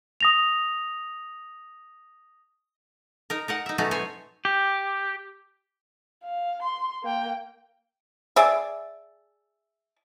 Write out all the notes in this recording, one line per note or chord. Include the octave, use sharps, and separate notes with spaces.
D#6 A#6 F7
D#4 A#4
D#4 A#4 F#5
D#4 E5
B2 F#3 A3 C#4 D#4 F#4
B3 C5 C#5 G#5
G4
F5
C6
A#3 G5
G#4 D5 E5